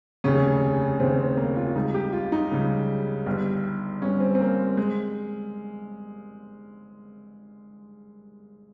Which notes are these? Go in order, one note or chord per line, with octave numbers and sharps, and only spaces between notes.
F1 D#2 C#3 C#4
F1 D#2 C#3 C4
C4
A#3
F4
F4
C#2 C#3 G3 D#4
G4
F4
D#4
C#2 C#3 G3
G1 G2 G3
G1 G2 G3 C#4
C4
C4
A#3
G#3